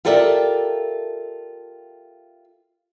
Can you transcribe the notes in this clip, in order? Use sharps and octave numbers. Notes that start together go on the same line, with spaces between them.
F4 G4 A4 A#4 D5 E5